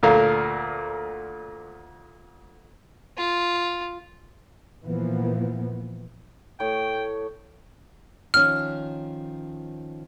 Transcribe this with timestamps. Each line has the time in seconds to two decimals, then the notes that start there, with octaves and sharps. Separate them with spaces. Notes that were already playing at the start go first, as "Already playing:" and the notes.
0.03 D2 A#2 A3 A#4 F5
3.17 F4
4.83 A#2 E3 F3 A#3 B3
6.60 A2 C#5 G5
8.34 D#3 F3 C#4 F6